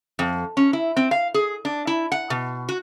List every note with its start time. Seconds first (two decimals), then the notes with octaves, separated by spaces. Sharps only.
0.19 F2
0.57 C#4
0.73 E4
0.97 C4
1.11 F5
1.34 G#4
1.65 D4
1.87 E4
2.12 F#5
2.30 B2
2.69 F#4